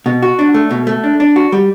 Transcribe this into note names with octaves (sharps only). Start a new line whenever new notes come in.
B2
F#4
D4
A3
B2
A3
D4
D4
F#4
G3